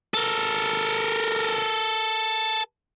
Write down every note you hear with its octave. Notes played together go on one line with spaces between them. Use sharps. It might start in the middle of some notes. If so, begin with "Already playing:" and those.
A4 A#4